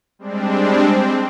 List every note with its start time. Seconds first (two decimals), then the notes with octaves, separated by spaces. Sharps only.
0.19 G3 G#3 C4 D4
0.84 C4